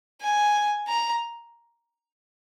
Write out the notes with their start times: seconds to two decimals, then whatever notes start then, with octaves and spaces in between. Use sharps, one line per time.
0.22 G#5
0.88 A#5